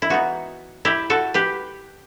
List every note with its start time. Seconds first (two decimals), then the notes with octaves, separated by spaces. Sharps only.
0.02 E4
0.09 E3 B3 D#4 F#4
0.85 E4 G4
1.10 F#4 A4
1.34 G4 B4